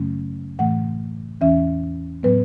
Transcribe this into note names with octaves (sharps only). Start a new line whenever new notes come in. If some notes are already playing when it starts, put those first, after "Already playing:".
Already playing: F#2 C#3 F#3 A3 C#4
A2 E3 A3 F#5
E2 E3 C#4 E5
A2 F#3 B3 B4